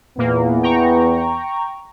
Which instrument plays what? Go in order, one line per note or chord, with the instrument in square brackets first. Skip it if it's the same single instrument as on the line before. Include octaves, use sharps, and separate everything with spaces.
[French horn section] E2 B3 [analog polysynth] A#2 A#3
[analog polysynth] G5 A#5 C#6